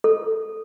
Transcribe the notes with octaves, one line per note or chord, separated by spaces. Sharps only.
A4